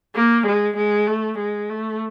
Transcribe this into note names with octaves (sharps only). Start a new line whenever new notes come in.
A#3
G#3
G#3
A3
G#3
A3